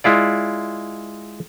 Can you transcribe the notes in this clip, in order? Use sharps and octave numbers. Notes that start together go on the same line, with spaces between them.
G#3 E4 F4 D5